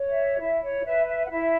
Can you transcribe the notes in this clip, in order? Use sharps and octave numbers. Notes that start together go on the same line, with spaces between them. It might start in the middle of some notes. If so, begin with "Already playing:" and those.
Already playing: C#5
E5
E4 E5
C#5
B4 E5
E5
F#5
E4 E5